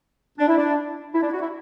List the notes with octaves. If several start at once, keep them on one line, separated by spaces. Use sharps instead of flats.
D4
E4
D4
E4
D4
F#4
E4